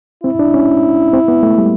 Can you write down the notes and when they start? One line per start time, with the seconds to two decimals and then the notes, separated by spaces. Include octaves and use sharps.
0.24 C4 E4
0.39 D4
0.54 C#4
1.13 C4
1.28 B3
1.43 A3
1.58 G3